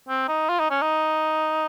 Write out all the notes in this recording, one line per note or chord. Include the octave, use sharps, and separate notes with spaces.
C4
D#4
F4
D#4
C#4
D#4